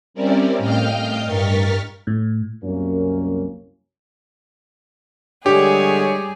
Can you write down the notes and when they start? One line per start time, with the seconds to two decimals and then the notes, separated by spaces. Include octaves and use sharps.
0.14 G3 C4 C#4 E4 A#4 D5
0.58 A2 D#5 F5 G5 F6 G6
1.24 G2 A#4 C#6 F6 A6 B6
2.07 A2
2.63 C2 F#2 A#3 C#4
5.46 D3 G3 G#3 G4 G#4 C#5